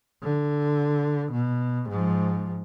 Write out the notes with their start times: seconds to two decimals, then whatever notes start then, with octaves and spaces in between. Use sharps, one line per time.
0.22 D3
1.32 B2
1.89 G#2 F3